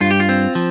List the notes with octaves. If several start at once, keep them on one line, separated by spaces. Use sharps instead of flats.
G2 F4
G4
F4
C4
F3